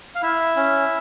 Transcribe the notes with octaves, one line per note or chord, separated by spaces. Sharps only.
F5
E4 E5
C#4